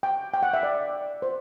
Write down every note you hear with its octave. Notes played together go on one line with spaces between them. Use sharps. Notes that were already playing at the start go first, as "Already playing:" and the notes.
G5
G5
F#5
E5
D5
C5